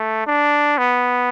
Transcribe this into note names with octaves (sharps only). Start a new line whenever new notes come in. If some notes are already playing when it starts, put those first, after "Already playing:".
Already playing: A3
D4
B3